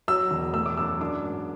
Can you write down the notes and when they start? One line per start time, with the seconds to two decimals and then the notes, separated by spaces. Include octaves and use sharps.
0.08 F#3 E6
0.31 E1
0.54 A3 E6
0.66 D6
0.77 F#2 E6
1.00 D4 D6
1.23 G#2